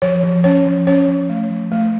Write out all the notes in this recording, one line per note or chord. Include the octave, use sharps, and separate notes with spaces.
F3 C#5
F3
C#4 C#5
F3
C#4 C#5
F3
A3
F3
A3